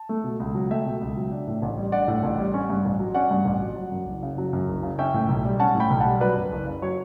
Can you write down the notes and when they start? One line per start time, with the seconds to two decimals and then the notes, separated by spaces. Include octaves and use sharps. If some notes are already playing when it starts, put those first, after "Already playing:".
Already playing: A5
0.09 A3
0.24 B2
0.40 C#2
0.55 F#3
0.70 A3 E5 G5
0.85 B2
1.01 C#2
1.17 F#3
1.31 D4
1.47 A2
1.62 A1
1.78 G3
1.92 D4 D5 F#5
2.08 A2
2.23 A1
2.38 G3
2.54 C#4
2.70 G2
2.85 A1
3.00 F#3
3.14 C#4 D5 F#5
3.31 G2
3.45 A1
3.62 F#3
3.76 F#3
3.92 F#2
4.06 F#1
4.23 C#3
4.38 F#3
4.53 F#2
4.69 F#1
4.83 C#3
4.99 C#4 E5 G5
5.14 A2
5.29 B1
5.45 G3
5.60 C#4 F#5 A5
5.75 A2
5.80 G5 B5
5.90 B1
6.00 F#5 A5
6.06 G3
6.20 F#3 B4 D5
6.36 F#2
6.52 F#1
6.67 C#3
6.82 F#3 C#5